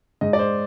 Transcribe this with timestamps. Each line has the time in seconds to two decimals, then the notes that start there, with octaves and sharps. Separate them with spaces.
0.21 G#2 D#5
0.33 D5
0.39 C5